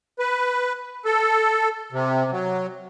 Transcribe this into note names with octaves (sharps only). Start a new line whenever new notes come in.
B4
A4
C3
F#3